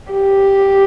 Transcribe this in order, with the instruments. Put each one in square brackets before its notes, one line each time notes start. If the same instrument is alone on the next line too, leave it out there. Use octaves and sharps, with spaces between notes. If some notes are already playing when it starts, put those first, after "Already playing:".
[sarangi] G4